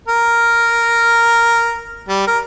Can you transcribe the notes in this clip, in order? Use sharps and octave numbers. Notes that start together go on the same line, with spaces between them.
A#4
G3
A#4